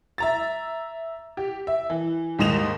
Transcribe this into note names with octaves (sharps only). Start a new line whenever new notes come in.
E5 A#5 A6
G4
E5
E3
D#2 G#2 D#5 E7 F7